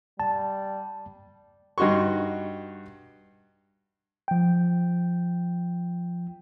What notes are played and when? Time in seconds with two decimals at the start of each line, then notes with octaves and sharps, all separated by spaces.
0.20 G3 A5
1.78 G2 D#4 F#4 C6 C#6
4.28 F3 G5